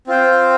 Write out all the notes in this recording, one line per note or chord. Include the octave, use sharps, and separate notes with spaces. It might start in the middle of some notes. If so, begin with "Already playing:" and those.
C4 F4 C5 G5